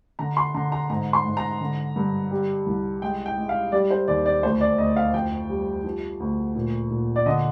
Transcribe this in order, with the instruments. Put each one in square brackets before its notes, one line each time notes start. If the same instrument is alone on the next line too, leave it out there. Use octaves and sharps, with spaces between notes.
[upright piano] D3 A#5
C6
D3 A#5
A#5
G#2 A#5
C6
G#2
A#5
D3
G2
G3
C2
G#3 G5
G5
G#3
F5
G3 D5
C5
D#2 D5
D5
D2 C5
D5
D2 D#5
F5
F2 G5
G3
F3
D2
A#2
A#2
D5
D3 D#5